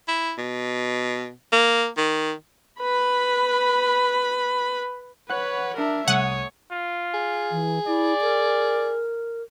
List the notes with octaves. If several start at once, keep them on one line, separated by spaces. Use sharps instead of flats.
E4
B2
A#3
D#3
B4 B5
B4 C#5 F#5 B5 F#6
D4 A#4 E5
C2 A3 C#5 F#5 D#6
F4
G#4
E3
E4 D5
A#4